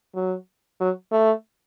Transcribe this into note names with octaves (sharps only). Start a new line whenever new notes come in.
F#3
F#3
A3